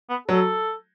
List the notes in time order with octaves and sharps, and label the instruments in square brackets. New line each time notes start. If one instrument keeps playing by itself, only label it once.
[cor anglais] B3
[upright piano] F#3 [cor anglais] A4